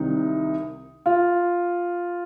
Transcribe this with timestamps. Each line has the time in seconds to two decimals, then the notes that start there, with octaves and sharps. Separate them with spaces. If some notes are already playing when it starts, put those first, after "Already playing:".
Already playing: C2 C3 D#3 D#4
1.06 F4